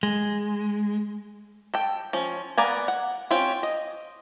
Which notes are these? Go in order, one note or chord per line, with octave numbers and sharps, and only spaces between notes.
G#3
A4 G5
F3 C#4
B3 A#4 D5 F5 G#5
F#5
C4 C#4 F4 G4
D#5